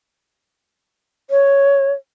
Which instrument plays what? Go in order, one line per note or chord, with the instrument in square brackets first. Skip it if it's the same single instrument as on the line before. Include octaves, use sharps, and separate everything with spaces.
[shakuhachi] C#5